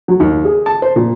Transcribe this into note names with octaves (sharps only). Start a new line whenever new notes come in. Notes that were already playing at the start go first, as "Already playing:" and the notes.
F#3
D#2
G#4
A5
C5
A#2